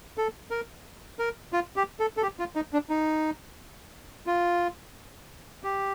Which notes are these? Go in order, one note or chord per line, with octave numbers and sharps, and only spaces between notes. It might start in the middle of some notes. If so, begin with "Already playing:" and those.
A4
A#4
A#4
F4
G4
A4
A4
G4
F4
D#4
D4
D#4
F4
G4